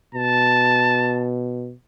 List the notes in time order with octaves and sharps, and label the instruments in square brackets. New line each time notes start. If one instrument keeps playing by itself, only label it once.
[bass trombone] B2 [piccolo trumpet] A5